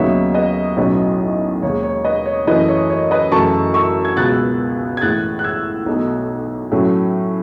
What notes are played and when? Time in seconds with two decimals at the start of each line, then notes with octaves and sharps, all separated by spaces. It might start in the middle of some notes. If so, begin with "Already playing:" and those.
Already playing: D#2 C#3 F#3 B3 D#4 C#5 E5
0.34 B4 D#5
0.77 B1 A2 F#3 C#4 E4 B4 D#5
1.62 D#2 D#3 G#3 C#5
1.83 C#5
2.05 B4 D#5
2.26 C#5
2.47 F#2 E3 A3 E4 B4 D#5
2.68 C#5
2.90 C#5
3.11 B4 D#5
3.32 F#2 C#3 E3 A3 E4 A5 C#6
3.74 C#6 E6
4.05 G#6
4.17 C#2 B2 G#3 B3 F#6 A6
4.97 G#6
5.01 A1 A2 G#3 F#6 A6
5.39 F#6
5.44 E6 G#6
5.86 B1 B2 A3 D#4
6.71 A2 F#3 A3 C#4